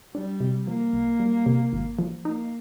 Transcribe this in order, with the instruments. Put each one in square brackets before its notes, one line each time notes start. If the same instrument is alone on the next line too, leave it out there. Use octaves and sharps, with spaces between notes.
[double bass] G3 [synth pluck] D4
[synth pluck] C3
[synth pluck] F3 [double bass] A#3
[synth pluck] C2
G3
C3
G#1
F3
[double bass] A#3 [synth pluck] D#4